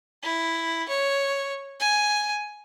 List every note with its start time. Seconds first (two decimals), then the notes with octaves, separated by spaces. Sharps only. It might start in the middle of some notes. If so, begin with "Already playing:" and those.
0.23 E4
0.88 C#5
1.80 G#5